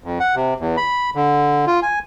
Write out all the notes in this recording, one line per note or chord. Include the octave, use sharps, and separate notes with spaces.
F2
F#5
C3
E2
B5
D3
F4
G#5